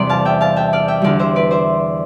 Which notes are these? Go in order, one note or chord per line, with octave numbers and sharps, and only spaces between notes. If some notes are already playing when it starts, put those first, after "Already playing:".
Already playing: E2 C3 G3 C5 D5
F5 A5
E5 G5
F5 A5
E5 G5
D5 F5
E5 G5
E2 D3 G3 D5 F5
C5 E5
B4 D5
C5 E5